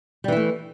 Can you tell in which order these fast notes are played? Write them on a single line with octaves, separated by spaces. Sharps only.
G3 E3 E4 A3